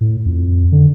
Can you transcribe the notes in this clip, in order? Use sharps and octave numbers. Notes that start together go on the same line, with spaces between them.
A2
F2
D3